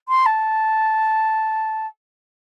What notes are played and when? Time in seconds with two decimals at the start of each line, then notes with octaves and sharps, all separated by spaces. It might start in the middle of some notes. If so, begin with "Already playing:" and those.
0.09 C6
0.26 A5